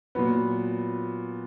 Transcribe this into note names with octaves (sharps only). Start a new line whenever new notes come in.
A#2 F#3 B3